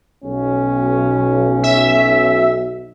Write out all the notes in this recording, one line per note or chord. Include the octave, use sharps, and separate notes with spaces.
B1 C#4
E5